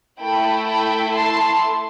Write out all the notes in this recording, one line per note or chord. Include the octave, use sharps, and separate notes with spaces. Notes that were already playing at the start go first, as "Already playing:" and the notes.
A3 E4 A4 G5 B5
G5 B5
A5 C6